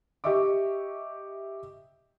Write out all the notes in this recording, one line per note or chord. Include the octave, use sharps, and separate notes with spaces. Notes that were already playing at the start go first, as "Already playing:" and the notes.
G4 D#5 E5 C#6 D6